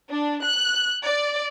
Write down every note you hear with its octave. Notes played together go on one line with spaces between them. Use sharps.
D4
F#6
D5